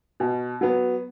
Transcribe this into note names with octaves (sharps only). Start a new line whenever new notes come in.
B2
F#3 B3